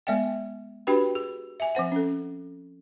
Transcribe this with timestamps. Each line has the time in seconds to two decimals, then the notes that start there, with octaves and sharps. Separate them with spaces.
0.07 G#3 B3 D5 E5 F5 G5
0.87 D4 F#4 G4 B4 G5 B5
1.15 G#4
1.60 E5 G#5
1.75 F3 C4 C5 F#5
1.92 C#4 A4